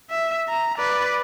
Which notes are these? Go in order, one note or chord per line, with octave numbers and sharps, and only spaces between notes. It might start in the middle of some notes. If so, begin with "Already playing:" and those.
E5
A#5
B4 D5